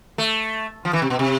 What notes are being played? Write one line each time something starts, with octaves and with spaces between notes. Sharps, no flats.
A3
F3
E3
C3
B2
C3